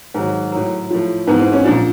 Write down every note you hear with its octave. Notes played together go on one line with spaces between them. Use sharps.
G#2 D#3 F#3
A2 F#3
A2 F3
G#2 E3 B3
C4
C#4
A#2 F3 D4